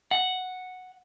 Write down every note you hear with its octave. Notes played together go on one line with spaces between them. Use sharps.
F#5